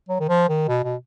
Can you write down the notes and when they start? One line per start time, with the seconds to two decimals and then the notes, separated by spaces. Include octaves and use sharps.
0.09 F#3
0.20 D#3
0.29 F3
0.49 D#3
0.68 B2
0.84 B2